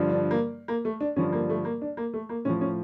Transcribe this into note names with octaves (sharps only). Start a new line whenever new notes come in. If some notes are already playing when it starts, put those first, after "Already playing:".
Already playing: G2 D3 F3
D4
A#3
A#3
A3
D4
G2 D3 F3 C#4
A#3
A3
A#3
D4
A#3
A3
A#3
A2 F3 C#4
C#4